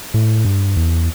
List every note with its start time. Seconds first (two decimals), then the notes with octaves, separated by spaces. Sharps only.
0.14 A2
0.45 G2
0.77 E2